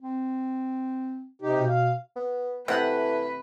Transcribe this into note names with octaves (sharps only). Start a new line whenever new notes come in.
C4
C3 D#4 G4
B2
F5
B3
C3 E3 A3 B4 F#5